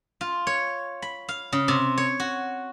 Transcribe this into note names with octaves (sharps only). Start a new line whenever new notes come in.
F4
C#5
B5
F5
C#3
C3
C#5
F#4